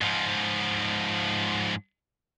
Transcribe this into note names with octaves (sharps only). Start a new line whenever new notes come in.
G#2 F3